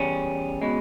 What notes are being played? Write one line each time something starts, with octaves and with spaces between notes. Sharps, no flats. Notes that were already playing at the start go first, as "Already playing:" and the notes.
Already playing: E2 C#3 G3 C#4
B2 G#3